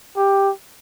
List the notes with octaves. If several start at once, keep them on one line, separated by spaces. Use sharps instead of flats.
G4